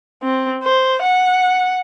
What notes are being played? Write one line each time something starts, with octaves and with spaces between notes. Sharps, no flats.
C4
C5
F#5